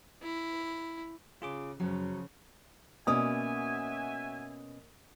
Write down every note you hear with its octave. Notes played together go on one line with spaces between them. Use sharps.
E4
C#3 F4 G#4 D6
F#2 C#3 F3 F#3
B2 A#3 C#4 F#4 D5 E5 G#5 D#6